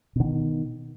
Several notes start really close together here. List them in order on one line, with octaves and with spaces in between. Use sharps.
B2 D3 D#3